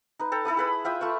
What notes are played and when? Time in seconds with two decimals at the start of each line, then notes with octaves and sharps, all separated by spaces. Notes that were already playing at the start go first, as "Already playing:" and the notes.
0.19 D#4 B4
0.32 A4 G5 A#5
0.45 E4 A4 B5 D#6
0.57 G#4 B4 B5
0.84 F4 E5 G5 D#6
1.01 A3 F4 C#6